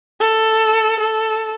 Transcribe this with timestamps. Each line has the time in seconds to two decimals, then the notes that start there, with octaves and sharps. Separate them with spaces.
0.21 A4
1.00 A4